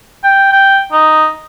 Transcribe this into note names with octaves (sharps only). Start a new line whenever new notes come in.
G5
G5
D#4